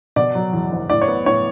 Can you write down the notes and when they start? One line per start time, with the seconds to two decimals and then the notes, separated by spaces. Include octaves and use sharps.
0.16 B2 D5
0.35 F#3
0.53 E2
0.72 F#1
0.90 A2 D5
1.02 C#5
1.08 B3
1.26 A2 C#5